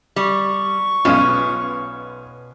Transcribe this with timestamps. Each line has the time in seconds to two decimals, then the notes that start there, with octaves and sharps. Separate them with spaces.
0.16 G3 C#6
1.05 B1 B2 B3 C#4 F4